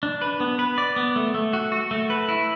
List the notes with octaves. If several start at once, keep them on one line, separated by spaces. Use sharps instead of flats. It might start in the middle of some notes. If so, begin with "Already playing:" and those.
D4
B4
B3
B4
D5
B3
A3
A3
F#4
F#4
A3
B4
E4